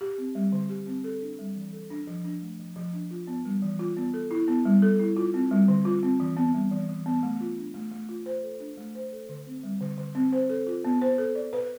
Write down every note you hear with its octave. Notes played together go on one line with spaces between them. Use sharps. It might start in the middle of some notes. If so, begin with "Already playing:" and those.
G4
C4
G3
D3
G4
C4
A4
D4
G3
E3
A4
D4
F3
D4
A3
F3
F3
D4
F4
B3
G3
E3
F4
B3
A4
E4
B3
G3
A4
E4
F4
C4
G3
D3
F4
C4
E3
B3
G3
E3
E3
B3
A3
F4
D4
A3
A3
F4
C5
A4
D4
A3
C5
A4
D3
C4
G3
D3
D3
C4
C5
A4
F4
B3
C5
A4
D5
B4